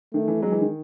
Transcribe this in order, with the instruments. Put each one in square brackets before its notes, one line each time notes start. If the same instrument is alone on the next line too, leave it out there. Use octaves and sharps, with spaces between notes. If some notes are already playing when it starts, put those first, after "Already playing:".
[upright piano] D#3 [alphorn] A3
[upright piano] E3
[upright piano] F#3 [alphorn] G#3
[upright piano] E3
D#3